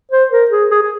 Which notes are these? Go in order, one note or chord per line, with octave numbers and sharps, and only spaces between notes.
C5
A#4
G#4
G#4
G#4